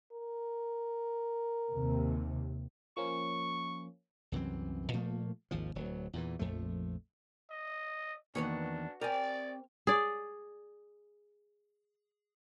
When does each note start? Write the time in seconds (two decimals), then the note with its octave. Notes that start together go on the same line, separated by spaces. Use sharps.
0.12 A#4
1.71 D#2 C3
2.97 F3 A#3 C#4 C#6
4.32 C2 F#2 E3 C4
4.93 A#2 F3 A3 A#3
5.51 G#1 D#2 F3
5.75 D1 F#3
6.13 E2 A#2 E3
6.39 A#1 F2 F3 A3
7.50 D#5
8.35 E2 D#3 A#3 D4 F#4 B4 C#5
9.01 C4 G4 A#4 D5 G#5
9.87 G#4 D5